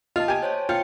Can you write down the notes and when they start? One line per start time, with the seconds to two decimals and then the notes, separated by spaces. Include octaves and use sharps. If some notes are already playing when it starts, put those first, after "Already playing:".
0.16 F4 D#5 A5
0.28 G4 G#5
0.43 C5 C#5 A5
0.69 F4 G5 G6 C#7